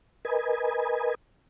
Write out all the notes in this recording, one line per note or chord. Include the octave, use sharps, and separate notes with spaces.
A#4 B4 D#5 G#5